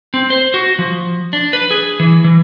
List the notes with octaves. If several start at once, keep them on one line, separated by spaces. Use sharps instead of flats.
C4
C5
F#4
F3
D4
B4
G#4
E3
E3